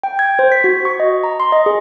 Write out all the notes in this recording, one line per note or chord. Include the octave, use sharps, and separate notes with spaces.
G5
G#6
C5
B6
F#4
C#6
D#5
A#5
C6
D#5
G#4